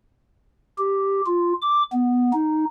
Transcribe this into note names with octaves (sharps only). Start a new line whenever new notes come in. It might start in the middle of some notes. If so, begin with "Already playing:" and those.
G4
F4
D6
B3
D#4